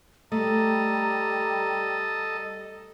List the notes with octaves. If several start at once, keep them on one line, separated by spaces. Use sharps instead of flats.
G3 A3 A4 D#5 A#5